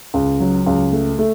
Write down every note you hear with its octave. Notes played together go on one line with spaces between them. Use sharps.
C#2
F#3
C#2
A3
A3